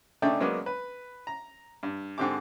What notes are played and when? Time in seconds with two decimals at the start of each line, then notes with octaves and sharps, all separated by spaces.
0.22 C#3 A3 D4 D#4 D5 G5
0.40 F#3 G#3 A#3 B3 C#4 D5
0.66 B4
1.27 A#5
1.83 G2
2.18 G#2 D3 C4 G4 D6